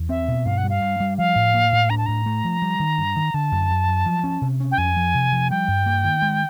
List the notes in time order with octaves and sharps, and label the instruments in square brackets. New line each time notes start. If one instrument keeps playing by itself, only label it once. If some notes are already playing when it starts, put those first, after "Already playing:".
Already playing: [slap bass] E2
[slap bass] C4 [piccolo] E5
[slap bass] B2
[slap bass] G2 [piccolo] F5
[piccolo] F#5
[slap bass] G3
[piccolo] F5
[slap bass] G2
G3
[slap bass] F3 [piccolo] F5
[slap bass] A2
A#3
A2
[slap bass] D4 [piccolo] A#5
[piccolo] A5
[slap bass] A2 [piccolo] A#5
[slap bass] A3
F3
G3
D#3
G2
D#3
[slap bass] D3 [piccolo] A5
[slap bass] F#2
F#2
F#3
F3
C#4
C3
C#4
[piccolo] G5
[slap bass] F2 [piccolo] G#5
[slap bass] F3
C3
F3
[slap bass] G3 [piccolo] G5
[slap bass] G2
A#3
D#3
G#3